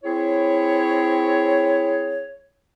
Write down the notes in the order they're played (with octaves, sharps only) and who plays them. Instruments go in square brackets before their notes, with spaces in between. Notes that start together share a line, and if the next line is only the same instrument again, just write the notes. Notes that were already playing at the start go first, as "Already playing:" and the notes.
[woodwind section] C4 E4 G#4 C#5